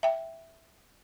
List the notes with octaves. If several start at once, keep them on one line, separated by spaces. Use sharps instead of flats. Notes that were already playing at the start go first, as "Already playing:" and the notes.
E5 G5